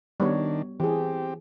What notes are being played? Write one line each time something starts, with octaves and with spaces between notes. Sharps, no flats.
D#3 G3 B3 D4 C#5
E3 C4 G4 G#4